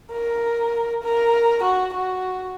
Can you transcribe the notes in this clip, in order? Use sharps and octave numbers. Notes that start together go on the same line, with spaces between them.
A#4
A#4
F#4
F#4